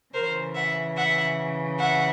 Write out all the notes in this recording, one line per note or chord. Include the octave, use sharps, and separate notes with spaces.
C#3 E3 A#4 C5
E5 F#5
E5 F#5
E5 F#5